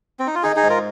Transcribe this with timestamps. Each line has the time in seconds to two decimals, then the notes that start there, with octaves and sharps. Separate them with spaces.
0.19 C4
0.27 D#4
0.35 F4
0.43 D#3 D#4 G#4
0.56 D#4 G#4
0.63 G#2
0.70 F4 A#4